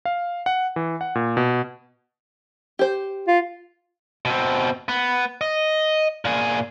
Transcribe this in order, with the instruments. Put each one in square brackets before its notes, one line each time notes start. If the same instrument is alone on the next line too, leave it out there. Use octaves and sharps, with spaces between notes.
[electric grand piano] F5
F#5
E3
F#5
A#2
B2
[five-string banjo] G4 C5
[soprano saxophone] F4
[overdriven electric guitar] B2 C4
B3
D#5
A#2 G#4